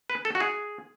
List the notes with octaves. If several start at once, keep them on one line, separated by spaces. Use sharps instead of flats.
B4
A4
F#4
G#4